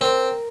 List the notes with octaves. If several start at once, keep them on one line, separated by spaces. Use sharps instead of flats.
C4 A#4